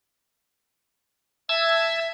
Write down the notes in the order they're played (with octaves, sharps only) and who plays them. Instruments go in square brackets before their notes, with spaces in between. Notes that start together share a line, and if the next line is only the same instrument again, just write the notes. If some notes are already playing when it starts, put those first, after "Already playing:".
[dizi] E5 [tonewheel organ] A5 E6 G#6